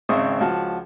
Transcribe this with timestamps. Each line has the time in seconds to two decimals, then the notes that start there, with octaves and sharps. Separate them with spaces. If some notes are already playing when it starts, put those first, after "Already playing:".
0.09 G#1 C#3 C4 E5 C#6 D#6
0.40 C#2 F3 F#4 A5